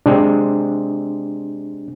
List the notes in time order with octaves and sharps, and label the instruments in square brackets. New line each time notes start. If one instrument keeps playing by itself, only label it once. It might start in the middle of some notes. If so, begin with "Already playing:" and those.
[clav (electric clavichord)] C3 G#3 C4 [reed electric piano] D4